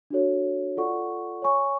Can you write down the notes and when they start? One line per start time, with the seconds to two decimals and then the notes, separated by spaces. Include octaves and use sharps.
0.10 D4 F#4 A4 C#5
0.77 F4 A4 D5 F#5 C#6
1.42 C#5 G#5 C#6